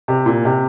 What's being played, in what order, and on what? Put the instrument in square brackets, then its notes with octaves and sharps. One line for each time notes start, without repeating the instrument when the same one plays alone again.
[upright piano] C3
A#2
C3